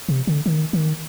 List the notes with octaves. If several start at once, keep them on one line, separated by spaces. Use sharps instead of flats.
C3
D3
D#3
D#3